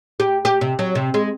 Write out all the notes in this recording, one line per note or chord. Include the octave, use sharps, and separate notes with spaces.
G4
G4
C3
F#3
C3
G#3